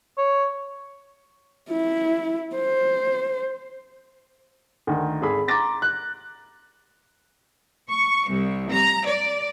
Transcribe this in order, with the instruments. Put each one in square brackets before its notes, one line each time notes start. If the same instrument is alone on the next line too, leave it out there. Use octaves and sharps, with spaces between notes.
[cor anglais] C#5
[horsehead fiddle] E4
C5
[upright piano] D2 D#3
G#1 G#4 A4 B5
A#5 C6 D6 A6 A#6
F#6
[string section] C#6
C2
A#5
D5